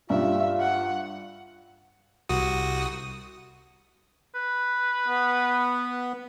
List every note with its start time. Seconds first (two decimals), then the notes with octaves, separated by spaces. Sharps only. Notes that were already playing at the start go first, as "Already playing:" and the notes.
0.10 G2 F4 E5
0.60 F#5
2.29 C2 F#4 D#6
4.35 B4
5.07 B3